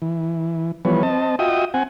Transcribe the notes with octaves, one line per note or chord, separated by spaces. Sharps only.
E3
E3 F3 G3 B3 B4 C#5
C4 D#5 A5
F4 F#4 D#5 E5 G5 D#6
C4 F#5 G#5